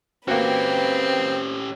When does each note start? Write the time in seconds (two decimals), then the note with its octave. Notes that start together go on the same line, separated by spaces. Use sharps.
0.28 A#3 C4 C#4 F#4 G4 B4